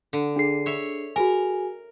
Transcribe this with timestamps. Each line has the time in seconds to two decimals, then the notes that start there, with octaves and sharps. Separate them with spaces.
0.13 D3
0.36 D4 G#4 C7
0.66 C#5 E5
1.16 F#4 G#4 A#4 G#5